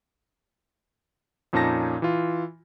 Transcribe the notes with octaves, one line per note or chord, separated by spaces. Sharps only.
F2 A#2 C#4 D#4 A5 A#6
E3 F4